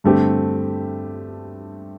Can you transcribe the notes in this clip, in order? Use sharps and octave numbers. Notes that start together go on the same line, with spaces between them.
G2 D3 A3 C4 G4